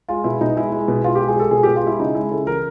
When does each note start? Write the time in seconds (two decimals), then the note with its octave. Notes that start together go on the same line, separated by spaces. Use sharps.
0.09 G#3 F4
0.24 B2 E4
0.41 B2 D#4
0.56 G#3 E4
0.72 G#3
0.88 B2
1.04 B2 F4
1.15 G#3 G4
1.28 G#4
1.36 G#3 A4
1.51 B2 G#4
1.63 B2 G4
1.76 F4
1.83 G#3 E4
2.00 C#3 D#4
2.15 G#3 E4
2.31 C#3 A4
2.47 E3 A#4